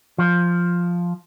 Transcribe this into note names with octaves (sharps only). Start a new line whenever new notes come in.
F3